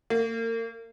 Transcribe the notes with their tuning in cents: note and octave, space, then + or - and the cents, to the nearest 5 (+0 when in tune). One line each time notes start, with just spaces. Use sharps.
A#3 -35